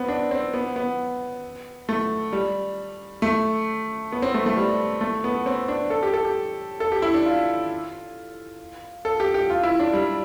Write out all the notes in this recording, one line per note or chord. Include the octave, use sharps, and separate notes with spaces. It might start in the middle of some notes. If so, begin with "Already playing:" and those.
Already playing: B3 C4
D4
C4
B3
B3
A3
G3
A3
B3
C4
A3
A3
G3
A3
B3
C4
D4
A4
G4
A4
G4
A4
G4
E4
D4
F4
A4
G4
G4
F4
E4
D4
G3